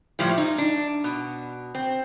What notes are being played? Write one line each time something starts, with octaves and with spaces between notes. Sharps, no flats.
A2 F3 G3
D#4
D4
B2
C4